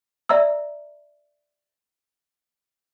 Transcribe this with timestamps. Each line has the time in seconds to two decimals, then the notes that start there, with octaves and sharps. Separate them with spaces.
0.29 D5 E5 A#5 E6